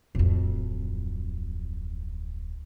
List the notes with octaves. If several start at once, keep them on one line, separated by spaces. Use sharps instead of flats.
D1 F2